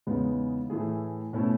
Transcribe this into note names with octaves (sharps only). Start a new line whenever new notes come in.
E2 C#3 G#3 B3 D#4
A2 E3 A3 E4 G#4
B2 A3 C#4 E4